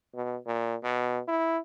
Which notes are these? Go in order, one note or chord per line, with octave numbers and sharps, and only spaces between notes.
B2
A#2
B2
E4